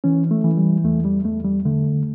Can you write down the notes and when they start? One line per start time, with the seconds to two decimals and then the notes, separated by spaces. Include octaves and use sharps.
0.04 E3 C#4
0.31 A3
0.44 E3
0.57 G3
0.84 E2 A3
1.05 G3
1.25 E2 A3
1.45 G3
1.65 D3 A3